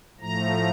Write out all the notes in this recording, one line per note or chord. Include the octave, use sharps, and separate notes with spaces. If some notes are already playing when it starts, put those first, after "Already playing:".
A2 F3 A3 A#5